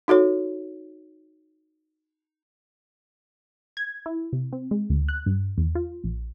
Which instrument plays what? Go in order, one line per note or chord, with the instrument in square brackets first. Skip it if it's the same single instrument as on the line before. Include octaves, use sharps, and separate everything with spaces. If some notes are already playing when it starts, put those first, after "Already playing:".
[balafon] D#4 F#4 A4 C#5
[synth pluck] G#6
E4
C3
C4
G#3
D2
F#6
G2
E2
F4
A#1